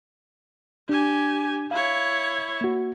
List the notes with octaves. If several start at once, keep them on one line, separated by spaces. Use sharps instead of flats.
D4 G4 G#5
E4 C#5 F5
A#3 F#4